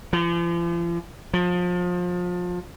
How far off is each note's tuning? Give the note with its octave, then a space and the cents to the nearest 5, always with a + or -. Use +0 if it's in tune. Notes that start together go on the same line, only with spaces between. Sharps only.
F3 -40
F3 +30